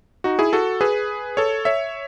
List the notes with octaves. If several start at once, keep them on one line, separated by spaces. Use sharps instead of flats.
D#4 F#4
E4 G#4
F#4 A4
G#4 B4
A4 C#5
C#5 E5